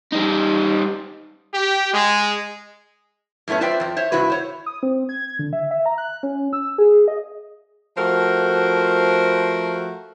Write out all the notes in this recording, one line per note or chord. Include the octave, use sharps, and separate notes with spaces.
G3 D#4
G4
G#3
F#2 A2 A3 B3 C#4
F4 B4 C5 D5 E5 G5
F2 F3
C5 C#5 E5
G2 C3 E4 F#4 B4
C5 C#5
D#6
C4
G#6
D3
E5
E5
A#5
F#6
C#4
E6
G#4
D#5
F3 A3 F#4 A#4 C5